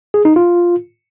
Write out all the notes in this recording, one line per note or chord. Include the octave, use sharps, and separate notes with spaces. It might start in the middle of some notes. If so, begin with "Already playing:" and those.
G#4
D#4
F4